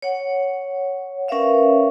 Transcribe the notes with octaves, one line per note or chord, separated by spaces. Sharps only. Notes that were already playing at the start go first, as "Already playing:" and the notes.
C#5 F#5
C#4 A#4 B4 C#5 E5 F5